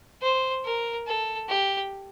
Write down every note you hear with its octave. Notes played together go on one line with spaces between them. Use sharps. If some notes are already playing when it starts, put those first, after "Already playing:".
C5
A#4
A4
G4